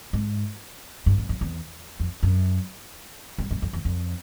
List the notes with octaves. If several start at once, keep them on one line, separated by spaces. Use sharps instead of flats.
G#2
G2
F#2
F2
E2
F2
F#2
G2
F#2
F2
E2
F2